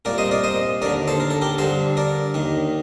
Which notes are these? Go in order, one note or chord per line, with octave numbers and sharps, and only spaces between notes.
C2 A#2 A#4 D5
C5 D#5
A#4 D5
C5 D#5
D#2 D3 A#4 D5
A4 C5
A#4
A4
G4 A#4
G2 D3 A4 C5
A#4 D5
D#2 D#3